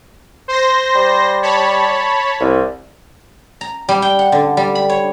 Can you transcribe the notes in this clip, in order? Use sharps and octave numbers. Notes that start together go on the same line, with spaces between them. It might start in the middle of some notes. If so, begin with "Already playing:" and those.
C5 C6 A#6
G3
C#5 A5 B5
C2
A#5
G3
G5
F#5
D3
G3
B5
C#5